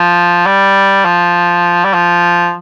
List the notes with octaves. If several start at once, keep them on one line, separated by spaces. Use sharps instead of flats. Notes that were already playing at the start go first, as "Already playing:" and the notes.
Already playing: F3
G3
F3
G3
F3